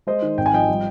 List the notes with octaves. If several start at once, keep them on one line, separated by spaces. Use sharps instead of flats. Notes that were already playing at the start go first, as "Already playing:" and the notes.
G#3 C5 D#5
D#3
G#1 G5
G#5
F3 D#5 G5
G3